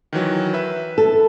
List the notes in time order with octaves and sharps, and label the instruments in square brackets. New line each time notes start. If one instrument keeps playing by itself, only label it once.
[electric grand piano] D#3 E3 F#3
B4 E5
[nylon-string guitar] A4